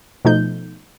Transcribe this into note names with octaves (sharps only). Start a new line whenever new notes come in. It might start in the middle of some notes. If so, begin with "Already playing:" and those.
B2 F3 A3 D#4 G6